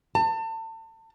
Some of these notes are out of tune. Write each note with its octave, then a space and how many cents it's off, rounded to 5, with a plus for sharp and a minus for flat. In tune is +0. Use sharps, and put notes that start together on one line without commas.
A5 +35